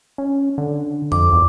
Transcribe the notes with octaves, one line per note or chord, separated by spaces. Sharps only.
C#4
D3
F2 D6
E2